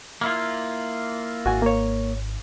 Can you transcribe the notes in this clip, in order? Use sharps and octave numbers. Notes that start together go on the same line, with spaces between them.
A#3 E4 F4
G#1 F#4 G#5
A#3 C#5